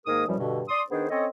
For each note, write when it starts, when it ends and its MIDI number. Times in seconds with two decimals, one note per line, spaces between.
0.06 0.24 44
0.06 0.24 51
0.06 0.24 58
0.06 0.24 68
0.06 0.24 70
0.06 0.24 87
0.27 0.35 42
0.27 0.35 52
0.27 0.35 53
0.27 0.35 55
0.38 0.62 43
0.38 0.62 47
0.38 0.62 50
0.69 0.82 74
0.69 0.82 84
0.69 0.82 87
0.91 1.05 51
0.91 1.05 59
0.91 1.05 62
0.91 1.05 68
0.91 1.05 72
1.09 1.26 60
1.09 1.26 61
1.09 1.26 69
1.09 1.26 73
1.09 1.26 75